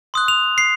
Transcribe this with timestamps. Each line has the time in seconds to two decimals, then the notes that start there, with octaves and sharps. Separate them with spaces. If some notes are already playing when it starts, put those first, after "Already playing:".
0.14 C6 D#6 F#6
0.28 F7
0.58 C7